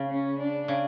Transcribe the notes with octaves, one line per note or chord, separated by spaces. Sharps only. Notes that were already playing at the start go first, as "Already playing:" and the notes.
Already playing: C#3
C#4
D4
C#3